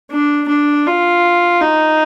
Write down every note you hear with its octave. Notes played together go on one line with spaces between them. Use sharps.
D4
D4
F4
D#4